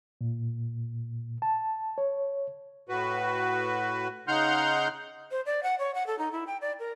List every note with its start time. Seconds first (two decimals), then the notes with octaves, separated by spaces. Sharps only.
0.21 A#2
1.42 A5
1.98 C#5
2.89 A2 F#4 B4
4.28 C#3 D#4 F#5 C6 F6 G6
5.30 C5
5.46 D5
5.63 F#5
5.79 C#5
5.95 F#5
6.07 A4
6.19 D#4
6.32 E4
6.47 G5
6.61 D5
6.79 A#4